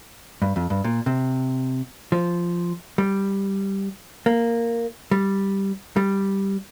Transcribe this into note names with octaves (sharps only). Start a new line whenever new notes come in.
G2
F2
G2
A#2
C3
F3
G3
A#3
G3
G3